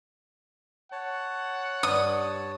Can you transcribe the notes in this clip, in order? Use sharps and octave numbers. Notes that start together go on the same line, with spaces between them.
C#5 F#5 A5
G2 D#6